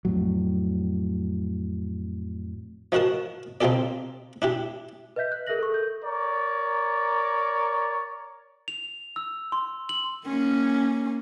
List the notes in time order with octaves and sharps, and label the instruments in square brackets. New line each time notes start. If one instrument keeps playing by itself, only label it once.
[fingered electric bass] F2 A2 F#3
[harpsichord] F3 D#4 F#4 A#4 A5
C4 D#4 F4 G4 A4 D5
D4 E4 G4
[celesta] B4 D#5 E5 G6 B6
F#6
G#4 A#4 E5 F#6 A#6 F#7
A4 A#4 C#6
A4 G6
[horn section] A#4 C#5 D5
[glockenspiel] F7
E6
C6
F#7
[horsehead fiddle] A#3 C#4